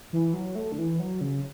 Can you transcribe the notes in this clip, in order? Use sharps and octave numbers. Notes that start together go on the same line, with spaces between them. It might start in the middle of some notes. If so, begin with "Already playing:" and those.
E3
F#3
A3
D3
E3
F#3
C#3